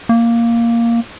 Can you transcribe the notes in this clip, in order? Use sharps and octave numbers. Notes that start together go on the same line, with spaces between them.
A#3